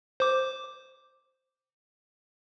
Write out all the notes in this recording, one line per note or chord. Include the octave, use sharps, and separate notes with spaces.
C5 D6